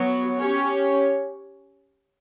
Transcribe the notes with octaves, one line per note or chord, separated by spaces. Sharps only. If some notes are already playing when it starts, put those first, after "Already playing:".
Already playing: F#3 B3 F#4 C#5
C#4 G4 C#5